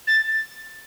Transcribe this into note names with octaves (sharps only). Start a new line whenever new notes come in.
A6